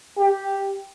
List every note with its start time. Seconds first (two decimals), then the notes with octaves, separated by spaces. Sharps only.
0.18 G4